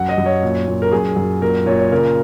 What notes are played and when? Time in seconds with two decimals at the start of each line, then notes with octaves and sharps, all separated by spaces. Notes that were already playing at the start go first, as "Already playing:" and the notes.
Already playing: F#2 F#5
0.09 D#5
0.18 F#2
0.26 C#5
0.43 A#2
0.67 A#2
0.82 A#4
0.92 F#2 G#4
1.16 F#2
1.41 A#2 A#4
1.66 A#2 C#5
1.79 C#5
1.92 C#3 A#4